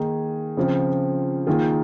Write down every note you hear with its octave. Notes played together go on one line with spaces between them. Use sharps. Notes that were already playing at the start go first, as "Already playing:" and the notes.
Already playing: D#3 A#3 D#4 G#4
C#3 F3 C4
D#3 A#3 F4 G#4